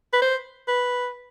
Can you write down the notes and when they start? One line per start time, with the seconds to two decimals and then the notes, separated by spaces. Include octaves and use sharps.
0.13 B4
0.21 C5
0.68 B4